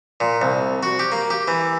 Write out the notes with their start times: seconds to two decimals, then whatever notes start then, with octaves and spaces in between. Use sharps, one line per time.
0.20 A#2
0.42 C2
0.83 F#4
0.99 G4
1.12 A#3
1.30 G4
1.48 E3